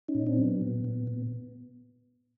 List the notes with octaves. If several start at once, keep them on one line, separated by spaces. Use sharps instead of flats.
C#4 D#4
A#2
C4 D4
F#3
B3
A#2
A#2
A#2